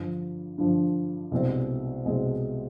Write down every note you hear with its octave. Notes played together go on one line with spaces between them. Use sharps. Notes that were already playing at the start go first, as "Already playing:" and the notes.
Already playing: G2 D3 F3
G2 D3 F3
C2 B2 G#3 C4
C2 B2 G#3 C4